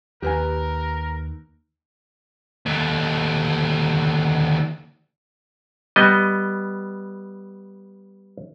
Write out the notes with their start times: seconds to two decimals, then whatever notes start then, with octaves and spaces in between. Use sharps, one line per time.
0.22 D#2 G4 A#4 B4 G#5
2.66 D#2 D3
5.96 G3 B3 D#5